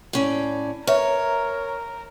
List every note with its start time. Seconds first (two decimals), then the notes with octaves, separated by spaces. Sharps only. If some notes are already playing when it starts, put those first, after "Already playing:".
0.13 A2 C#4 D5
0.87 A#4 B4 C#5 E5